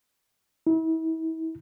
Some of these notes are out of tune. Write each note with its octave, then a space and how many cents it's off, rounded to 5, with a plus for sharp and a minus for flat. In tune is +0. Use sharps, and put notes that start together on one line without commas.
E4 -35